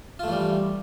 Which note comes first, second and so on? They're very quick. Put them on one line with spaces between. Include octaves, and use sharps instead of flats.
F4 A3 E3 G3